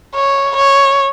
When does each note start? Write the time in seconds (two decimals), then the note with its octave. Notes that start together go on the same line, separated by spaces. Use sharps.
0.14 C#5
0.56 C#5